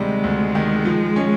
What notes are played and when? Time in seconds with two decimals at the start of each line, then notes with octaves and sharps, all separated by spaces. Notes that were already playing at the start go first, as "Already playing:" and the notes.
Already playing: D2 C3 D#3 G3 G#3
0.24 D2
0.55 D#3
0.85 F3
1.16 C#4